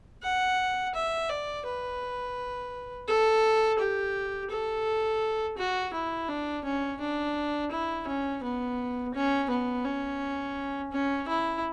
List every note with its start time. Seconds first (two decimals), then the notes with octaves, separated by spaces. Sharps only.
0.23 F#5
0.94 E5
1.29 D5
1.65 B4
3.08 A4
3.79 G4
4.50 A4
5.58 F#4
5.93 E4
6.29 D4
6.64 C#4
7.00 D4
7.71 E4
8.07 C#4
8.43 B3
9.14 C#4
9.50 B3
9.85 C#4
10.92 C#4
11.28 E4